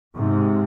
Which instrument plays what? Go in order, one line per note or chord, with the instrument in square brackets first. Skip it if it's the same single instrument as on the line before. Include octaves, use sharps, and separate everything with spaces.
[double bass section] G#2 C3